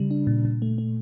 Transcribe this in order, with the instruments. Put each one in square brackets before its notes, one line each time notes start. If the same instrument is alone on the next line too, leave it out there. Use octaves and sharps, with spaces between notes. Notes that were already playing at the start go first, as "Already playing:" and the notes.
Already playing: [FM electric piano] C#3 G3
D4
A#2
A#2
A3
A3